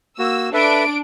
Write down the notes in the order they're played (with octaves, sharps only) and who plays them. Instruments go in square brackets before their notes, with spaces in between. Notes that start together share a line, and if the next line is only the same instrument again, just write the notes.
[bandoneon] A#3 F#4 [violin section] E6
[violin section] D4 D7 [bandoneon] A4 B4 E5